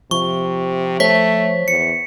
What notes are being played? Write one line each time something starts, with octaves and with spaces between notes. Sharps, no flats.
C3 F3 C#6
A3 C5 C#5 B6
E2 C#7